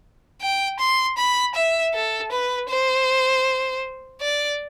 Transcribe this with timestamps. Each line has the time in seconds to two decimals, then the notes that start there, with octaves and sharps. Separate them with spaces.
0.41 G5
0.79 C6
1.18 B5
1.55 E5
1.94 A4
2.31 B4
2.69 C5
4.21 D5